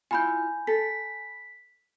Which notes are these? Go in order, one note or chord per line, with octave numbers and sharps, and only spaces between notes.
E4 F4 G#5 B5 G6
A4 B6